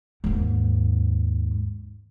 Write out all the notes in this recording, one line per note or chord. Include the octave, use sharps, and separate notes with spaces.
D#2 G#2